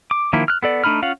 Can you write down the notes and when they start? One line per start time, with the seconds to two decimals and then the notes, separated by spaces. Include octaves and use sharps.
0.11 D6
0.33 D#3 F3 A#3 E4
0.48 F6 F#6
0.63 B3 A4 D5
0.84 A3 D4 D#4 B5 F6
1.02 C#4 F4 F5 F#5